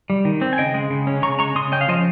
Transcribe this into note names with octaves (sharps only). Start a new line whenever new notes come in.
G3
D#3
C4
G#5
C#3 D#5 G5
G#3
C#3
C#4
C#3 A#5 C#6
G#3 A#5 C#6
C#3 C6 D#6
C#4 D#5 G5
F5
F3 C5 D#5